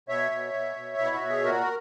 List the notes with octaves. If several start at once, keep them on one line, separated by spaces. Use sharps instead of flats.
B2 C#5 E5
B2
B2
B2
B2 E4
F#4
B2
G#4
A#2 F#4 A#4